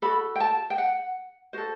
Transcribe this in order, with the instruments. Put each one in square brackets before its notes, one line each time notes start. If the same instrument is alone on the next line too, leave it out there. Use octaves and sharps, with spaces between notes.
[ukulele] F#4 A4 B5
G5
A5
G5
F#5
F#4 A4 C5